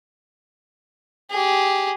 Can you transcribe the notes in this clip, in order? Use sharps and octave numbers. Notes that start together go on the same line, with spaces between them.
G4 G#4